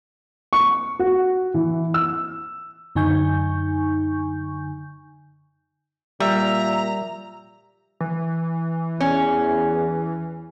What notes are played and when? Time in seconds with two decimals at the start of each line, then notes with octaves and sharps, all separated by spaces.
0.53 C#6
0.99 F#4
1.54 E3
1.94 E6
2.95 F#2 D3 D#4 G#5 C#6 G6
6.20 A#2 G3 E5 A#5
8.00 E3
9.00 E2 C#4